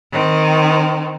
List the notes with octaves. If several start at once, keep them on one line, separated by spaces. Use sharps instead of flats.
D#3 C4